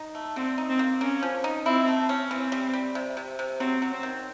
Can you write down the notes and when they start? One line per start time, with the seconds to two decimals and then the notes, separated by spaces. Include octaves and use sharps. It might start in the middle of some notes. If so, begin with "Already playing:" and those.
Already playing: D#4
0.15 A3
0.36 D3 C4
0.58 D#4
0.69 C4
0.79 A#3
1.01 A#3 C#4
1.23 F3
1.44 D#4
1.66 C4 E4
1.88 A3
2.09 C#4
2.30 E3 C4
2.52 G3
2.73 G3
2.95 C3
3.17 C3
3.39 C3
3.60 F#3 C4
3.82 F#3
3.92 C4
4.03 D#3